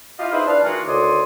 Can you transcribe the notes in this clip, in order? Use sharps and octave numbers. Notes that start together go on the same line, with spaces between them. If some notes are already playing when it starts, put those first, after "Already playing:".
E4 F4 G4 D#5 F5
D#4 E4 G#4 B4 C5 E5
D4 B4 F5
D#3 E3 G#3 A#3 F4 F#4
D2 D#3 C#5 D5 C6 D#6